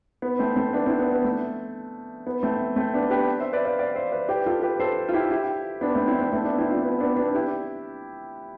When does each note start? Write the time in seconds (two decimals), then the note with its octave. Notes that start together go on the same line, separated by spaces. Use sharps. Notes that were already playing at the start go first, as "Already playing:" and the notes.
0.22 B3
0.39 A3 C4
0.56 A3 C4
0.73 B3 D4
0.86 C4 E4
0.99 B3
1.12 B3
1.24 A3
2.27 B3
2.43 A3 C4
2.76 A3 C4
2.94 B3 D4
3.11 G4 B4
3.40 C5 E5
3.53 B4 D5
3.65 D5 F5
3.79 D5 F5
3.95 C5 E5
4.12 B4 D5
4.29 G4 B4
4.46 F4 A4
4.63 G4 B4
4.80 A4 C5
5.09 F4
5.13 E4 G4
5.30 E4 G4
5.81 B3 D4
5.95 A3 C4
6.07 C4 E4
6.20 B3 D4
6.32 A3 C4
6.45 B3 D4
6.58 C4 E4
6.71 D4 F4
6.83 B3 D4
7.00 B3 D4
7.17 B3 D4
7.34 E4 G4